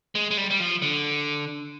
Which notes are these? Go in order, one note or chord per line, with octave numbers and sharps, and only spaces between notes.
G#3
G#3
G3
G3
F3
D3